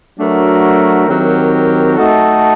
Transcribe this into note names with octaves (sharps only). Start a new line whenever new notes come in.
F#3 A3 D4 F#4 A#4
D#3 F#3 C4 G4 A#4
A3 D#4 F#4 A4